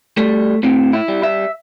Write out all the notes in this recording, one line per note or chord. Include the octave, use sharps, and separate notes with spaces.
G3 A3
A2 C4
E4
G3
E5